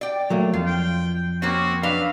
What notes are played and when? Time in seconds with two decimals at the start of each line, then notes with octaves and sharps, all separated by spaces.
0.01 D5 G5
0.30 F#3 A3 A#3
0.53 F2 F4
0.66 G5
1.42 A#3 C4 C#4 F#4
1.83 F#3 D4 B4 F5